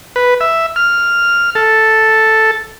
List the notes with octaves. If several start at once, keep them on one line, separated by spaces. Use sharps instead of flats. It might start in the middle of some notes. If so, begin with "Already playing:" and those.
B4
E5
F6
A4